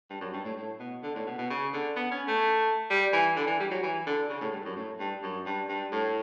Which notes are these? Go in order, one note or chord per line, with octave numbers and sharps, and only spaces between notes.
G2
F#2
G2
A2
A2
B2
D3
A2
B2
B2
C#3
D3
B3
C#4
A3
G3
E3
D3
E3
G3
F#3
E3
D3
C#3
A2
G2
F#2
A2
G2
F#2
G2
G2
A2